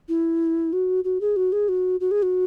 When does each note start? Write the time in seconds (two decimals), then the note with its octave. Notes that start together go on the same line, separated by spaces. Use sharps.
0.09 E4
0.73 F#4
1.04 F#4
1.21 G#4
1.36 F#4
1.52 G#4
1.68 F#4
2.00 F#4
2.11 G#4
2.22 F#4